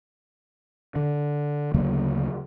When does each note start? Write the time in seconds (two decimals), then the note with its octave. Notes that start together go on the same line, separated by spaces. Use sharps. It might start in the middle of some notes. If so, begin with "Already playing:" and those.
0.96 D3
1.74 D2 C#3 F#3 A#3